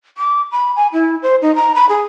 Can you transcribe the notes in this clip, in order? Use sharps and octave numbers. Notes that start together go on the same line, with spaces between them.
D6
B5
G#5
E4
C5
D#4
A#5
B5
G#4